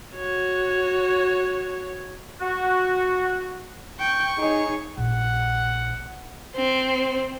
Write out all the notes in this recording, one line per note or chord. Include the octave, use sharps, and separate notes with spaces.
F#4 C#5
F#4
G5 C#6
D#4 G#4 C#5
A#1 F#5
C4